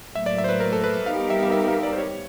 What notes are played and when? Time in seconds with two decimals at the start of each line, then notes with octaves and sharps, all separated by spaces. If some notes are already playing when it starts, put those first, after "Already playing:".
0.15 A2 F#3 A#3 E5
0.26 D5
0.38 E5
0.44 C5
0.49 B4
0.60 A#4
0.73 A4
0.84 B4
1.06 G3 B3 D#4 G4 A#4 F5
1.30 E5
1.43 F5
1.52 E5
1.68 F5
1.83 D5
1.93 C5
1.98 C#5